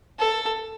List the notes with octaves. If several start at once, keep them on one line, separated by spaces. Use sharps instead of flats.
A4